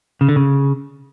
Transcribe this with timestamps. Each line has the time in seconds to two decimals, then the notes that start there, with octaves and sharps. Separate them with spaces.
0.21 C#3
0.29 D3
0.36 C#3